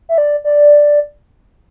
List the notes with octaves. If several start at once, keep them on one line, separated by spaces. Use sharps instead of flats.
E5
D5
D5